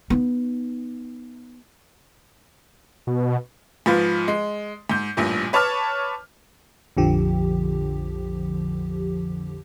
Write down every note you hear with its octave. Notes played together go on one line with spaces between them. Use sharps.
B3 D#4
B2
G#2 F3 B4 F5
G#3
G#2 G6
A1 G2 A#2
B4 C#5 A5 D6 F6
A#1 F2 D3 F3 G4